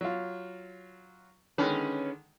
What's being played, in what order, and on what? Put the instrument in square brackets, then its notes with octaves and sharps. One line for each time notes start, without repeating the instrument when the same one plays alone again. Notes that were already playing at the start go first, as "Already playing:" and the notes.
[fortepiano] F#3 F4
[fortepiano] D3 D#3 G#3 [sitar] C#4 B4